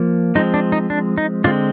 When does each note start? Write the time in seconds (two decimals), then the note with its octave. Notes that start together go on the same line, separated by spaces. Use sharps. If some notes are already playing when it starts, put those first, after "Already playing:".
Already playing: F3 A#3
0.35 F3 G#3 C4 D#4
0.54 D4
0.72 D#4
0.90 D4
1.18 D#4
1.44 D3 G#3 C4 D4 F4